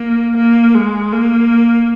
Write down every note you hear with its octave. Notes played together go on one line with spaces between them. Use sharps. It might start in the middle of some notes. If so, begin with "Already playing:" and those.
Already playing: A#3
A#3
G#3
A#3